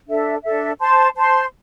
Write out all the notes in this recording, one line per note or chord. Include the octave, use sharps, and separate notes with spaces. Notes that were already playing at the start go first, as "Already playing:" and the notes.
D4 A4 E5
D4 A4 E5
C5 A5 C6
C5 A5 C6